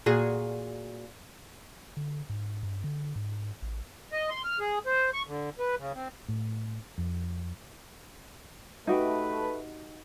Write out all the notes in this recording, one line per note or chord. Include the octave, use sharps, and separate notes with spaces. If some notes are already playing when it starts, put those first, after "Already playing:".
A#2 F#4 G#4
D3
G#2
G2
D3
G#2
A1
D#5
C6
F6
G#4
C5
C#6
D3
B4
C#3
C4
A2
F2
A3 D#4 F#4 G4 B4